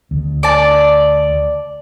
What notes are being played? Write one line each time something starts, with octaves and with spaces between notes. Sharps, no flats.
D2
D5 A5